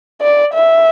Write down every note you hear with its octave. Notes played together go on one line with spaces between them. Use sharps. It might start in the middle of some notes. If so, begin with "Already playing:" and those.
D5
E5